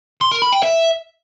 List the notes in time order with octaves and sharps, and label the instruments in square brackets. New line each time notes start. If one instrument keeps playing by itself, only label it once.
[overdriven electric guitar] C6
A#4
B5
G5
E5